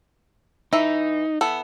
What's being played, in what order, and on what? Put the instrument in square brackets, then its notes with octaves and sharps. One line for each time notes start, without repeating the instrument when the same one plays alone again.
[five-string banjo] E3 E5 [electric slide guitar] D#4
[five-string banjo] E3 B3 A4